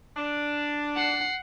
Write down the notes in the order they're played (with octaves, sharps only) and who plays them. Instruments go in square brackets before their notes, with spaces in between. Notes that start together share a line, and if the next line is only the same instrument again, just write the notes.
[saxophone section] D4
[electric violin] F#5 C7